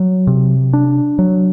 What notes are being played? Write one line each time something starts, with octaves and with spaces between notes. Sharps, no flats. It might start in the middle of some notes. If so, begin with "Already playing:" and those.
Already playing: F#3
C3
D4
F#3